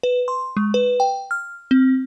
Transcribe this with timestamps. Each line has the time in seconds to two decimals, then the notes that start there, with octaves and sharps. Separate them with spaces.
0.03 B4
0.28 C6
0.57 G#3
0.74 B4
1.00 G5
1.31 F6
1.71 C4